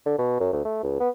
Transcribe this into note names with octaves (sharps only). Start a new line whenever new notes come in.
D3
B2
F#2
D2
A3
C#2
B3